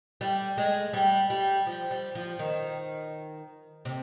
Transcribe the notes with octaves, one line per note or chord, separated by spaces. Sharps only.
G3
G#3
G3
G3
F3
G3
F3
D#3
C3